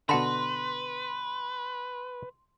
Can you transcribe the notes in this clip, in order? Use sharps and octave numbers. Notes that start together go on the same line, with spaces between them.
B2 D3 B4 F#5 A5 B5 C6